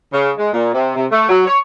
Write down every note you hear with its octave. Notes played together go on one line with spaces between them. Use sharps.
C#3
G#3
A#2
C3
C3
A3
F#3
C#5